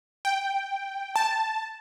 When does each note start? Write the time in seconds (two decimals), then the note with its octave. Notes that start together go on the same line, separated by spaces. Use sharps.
0.25 G5
1.16 A5